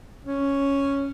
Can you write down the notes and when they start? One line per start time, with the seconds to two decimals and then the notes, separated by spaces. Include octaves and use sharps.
0.25 C#4